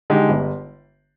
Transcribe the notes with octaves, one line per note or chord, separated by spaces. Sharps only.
D3 G#3 D#4 G4
G1